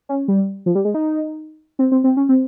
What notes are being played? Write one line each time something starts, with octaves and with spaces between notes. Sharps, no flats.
C#4
G3
F3
G3
G#3
D#4
C4
C4
C4
C#4
C4